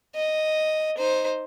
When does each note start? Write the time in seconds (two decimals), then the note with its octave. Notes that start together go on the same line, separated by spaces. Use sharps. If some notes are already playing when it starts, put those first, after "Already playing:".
0.15 D#5
0.98 D#4 C5